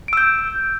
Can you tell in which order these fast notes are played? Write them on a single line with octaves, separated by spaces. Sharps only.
D7 E6 G6